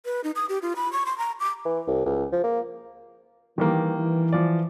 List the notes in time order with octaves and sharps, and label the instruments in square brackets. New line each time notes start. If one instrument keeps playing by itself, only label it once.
[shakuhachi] B4
D#4
D#6
G4
F4
B5
C#6
C6
A#5
D6
[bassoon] E3
C2
C#2
F3
A#3
[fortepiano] D#3 G3 A#3 [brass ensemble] E3
[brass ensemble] E3
[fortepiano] F3 D5